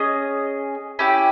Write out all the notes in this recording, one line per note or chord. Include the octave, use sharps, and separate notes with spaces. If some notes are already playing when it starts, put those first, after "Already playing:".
Already playing: C#4 G#4 D#5
C#4 E4 G4